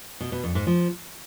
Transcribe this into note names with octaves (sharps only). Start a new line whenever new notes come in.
B2
B2
F2
G#2
F3